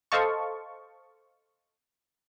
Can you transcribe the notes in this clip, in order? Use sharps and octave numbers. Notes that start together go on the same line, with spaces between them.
A4 C5 D#5 F5 A5 C#6